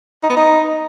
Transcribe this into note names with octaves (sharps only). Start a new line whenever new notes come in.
D#4
B3
D#4